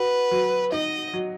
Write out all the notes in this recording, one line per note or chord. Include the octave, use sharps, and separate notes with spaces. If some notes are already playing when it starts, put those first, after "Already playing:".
Already playing: F#4 B4
F#3
D#4 D#5
F#3